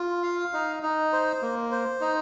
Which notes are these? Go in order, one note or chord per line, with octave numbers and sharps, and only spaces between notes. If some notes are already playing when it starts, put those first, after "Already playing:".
Already playing: F4
F5
D#4
D#4
C5
A#3
C5
D#4